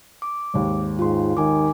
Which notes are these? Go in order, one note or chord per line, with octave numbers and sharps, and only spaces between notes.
D6
G#1 D#2
G#2 F4 C6
D#3 G#5 D6